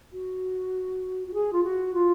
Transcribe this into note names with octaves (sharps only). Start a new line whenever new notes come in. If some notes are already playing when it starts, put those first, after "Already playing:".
F#4
F#4
G#4
F4
F#4
F4